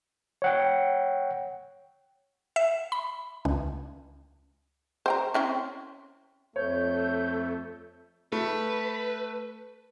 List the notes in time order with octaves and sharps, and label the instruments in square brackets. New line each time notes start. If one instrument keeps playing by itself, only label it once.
[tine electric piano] C#5 F#5 G5
[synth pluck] E5
B5
C#2
[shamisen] C5 G5 A#5
C4 C#4 E4
[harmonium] F2 [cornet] A3 [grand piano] C#5 [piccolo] G6
[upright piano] A3 [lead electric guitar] B4